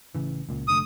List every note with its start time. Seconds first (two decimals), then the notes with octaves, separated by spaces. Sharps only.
0.15 A1 C#3 E3
0.49 C#2 A#2
0.68 F1 D3 A3 D#6